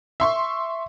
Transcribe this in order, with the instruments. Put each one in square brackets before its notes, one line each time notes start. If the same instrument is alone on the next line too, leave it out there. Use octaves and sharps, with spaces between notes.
[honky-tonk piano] E5 C6 C#6